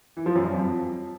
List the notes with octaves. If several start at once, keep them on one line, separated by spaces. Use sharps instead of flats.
E3
F3
F#2
G2
F2